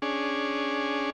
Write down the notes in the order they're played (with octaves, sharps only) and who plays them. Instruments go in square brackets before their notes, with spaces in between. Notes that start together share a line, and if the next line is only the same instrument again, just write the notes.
[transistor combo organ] C#4 D4 G#4